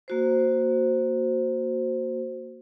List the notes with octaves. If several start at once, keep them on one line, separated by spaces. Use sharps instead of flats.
A#3 F#4 C5